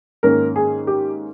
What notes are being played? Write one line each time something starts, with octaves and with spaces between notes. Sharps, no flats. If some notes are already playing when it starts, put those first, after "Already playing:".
G#2 D#3 A#3 C#4 A#4
G#4
G4